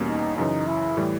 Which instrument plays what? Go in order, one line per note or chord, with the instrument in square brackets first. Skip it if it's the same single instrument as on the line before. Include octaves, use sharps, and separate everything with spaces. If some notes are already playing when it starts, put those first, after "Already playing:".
Already playing: [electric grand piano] E2 B2 G3 A#3 C#4
[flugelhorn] D#4
[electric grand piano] F#2 C#3 E3 [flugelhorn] D#4
[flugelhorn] E4
[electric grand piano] A2 E3 G3